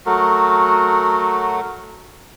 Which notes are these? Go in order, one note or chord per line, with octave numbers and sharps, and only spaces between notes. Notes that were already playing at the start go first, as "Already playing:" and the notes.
F#3 A3 F#4 A#4